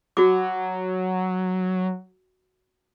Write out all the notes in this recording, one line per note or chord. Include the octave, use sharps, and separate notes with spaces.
F#3 F#4 D6